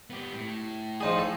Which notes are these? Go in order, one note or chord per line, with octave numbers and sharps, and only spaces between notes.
B3 G4
A2
F3 D#4 G#4
A4